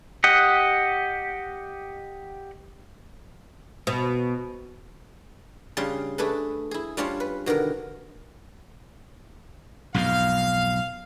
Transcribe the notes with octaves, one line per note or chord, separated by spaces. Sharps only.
G4 D#5 F#5
B2
C#3 G3 D4 G#4 F5 C6
A3 D4 G#4 A4 B4
E4 G#4
G3 C#4 D4 F4 C5 C#5
B4
B2 D3 D#3 A#4
B1 F2 G#2 F5